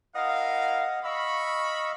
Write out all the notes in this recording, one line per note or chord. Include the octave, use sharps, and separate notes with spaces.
E4 A#4 D#5 F5 F#5 D#6
D#5 F5 B5 C#6 E6